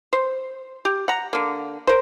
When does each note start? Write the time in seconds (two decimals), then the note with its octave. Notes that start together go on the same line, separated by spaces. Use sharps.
0.13 C5
0.85 G4
1.08 F#5 A#5
1.33 D3 A#3
1.87 A#4 C5